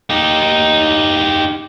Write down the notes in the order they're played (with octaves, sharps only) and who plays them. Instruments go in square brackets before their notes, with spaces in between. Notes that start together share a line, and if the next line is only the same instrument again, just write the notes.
[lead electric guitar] D#4 G4